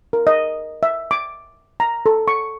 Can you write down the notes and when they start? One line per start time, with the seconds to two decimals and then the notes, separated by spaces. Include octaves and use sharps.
0.13 A#4
0.27 D#5
0.83 E5
1.11 D6
1.80 A#5
2.06 A4
2.28 C#6